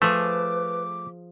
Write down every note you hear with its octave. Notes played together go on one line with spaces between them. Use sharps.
F3 A3 G#4 B4 D6